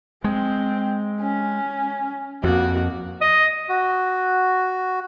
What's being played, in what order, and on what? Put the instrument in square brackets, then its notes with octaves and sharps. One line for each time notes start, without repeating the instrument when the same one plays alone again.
[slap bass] G#3 [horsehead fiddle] C4
[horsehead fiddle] C#4
[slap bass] F2 [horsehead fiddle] A#3 F#4
[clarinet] D#5
[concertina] F#4